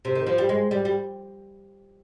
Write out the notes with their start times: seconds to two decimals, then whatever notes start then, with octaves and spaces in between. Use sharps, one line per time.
0.05 C3
0.15 D#3
0.27 F3
0.38 G3
0.49 G#3
0.71 G3
0.85 G3